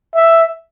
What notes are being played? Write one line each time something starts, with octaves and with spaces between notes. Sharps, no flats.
E5